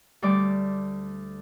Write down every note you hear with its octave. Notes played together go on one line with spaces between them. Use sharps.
D2 G3 D5 D6